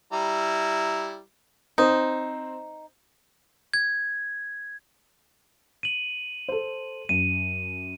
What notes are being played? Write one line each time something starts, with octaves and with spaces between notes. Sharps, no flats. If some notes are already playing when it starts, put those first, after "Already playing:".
G3 E4 A#5
C4 D#4 C5
G#6
D#7 F#7
A4 C5
F#2 D#7